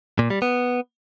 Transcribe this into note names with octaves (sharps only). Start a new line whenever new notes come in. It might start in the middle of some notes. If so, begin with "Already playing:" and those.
A#2
G3
B3